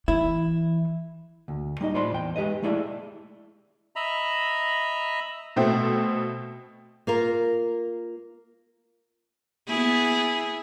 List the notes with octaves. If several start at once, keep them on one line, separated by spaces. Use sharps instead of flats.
E3 E4
D2
G3 D#4 D#5
A2 F4 C5 D5 B5 C6
E2 G5
G#3 G4 B4 D#5
G#3 A3 E4 G#4 D5 E5
D#5 E5 A#5 B5
B2 A3 C4
A#3 F4 A#4
B3 E4 G#4